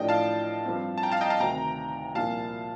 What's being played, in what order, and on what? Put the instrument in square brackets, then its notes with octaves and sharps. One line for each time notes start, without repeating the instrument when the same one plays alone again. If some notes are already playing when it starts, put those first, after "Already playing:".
Already playing: [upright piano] A1 A2 F3 A3 D4 [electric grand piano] D#5 G5
[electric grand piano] F5 A5
[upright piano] G2 F3 C4
[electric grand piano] A5
G5 A#5
F5 A5
D#5 G5
F5 A5
[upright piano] D2 C3 D#3 [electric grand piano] G5 A#5
[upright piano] C2 A#2 F3 A#3 [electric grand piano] F5 A5